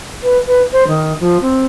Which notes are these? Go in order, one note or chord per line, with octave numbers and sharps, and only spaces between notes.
B4
B4
C5
D#3
F3
C4